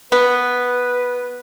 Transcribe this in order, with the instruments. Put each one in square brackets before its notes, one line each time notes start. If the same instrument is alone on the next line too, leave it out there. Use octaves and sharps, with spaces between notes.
[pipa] B3 [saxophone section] B4